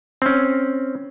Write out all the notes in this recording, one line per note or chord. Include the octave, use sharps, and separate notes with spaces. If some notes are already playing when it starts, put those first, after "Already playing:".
C4 C#4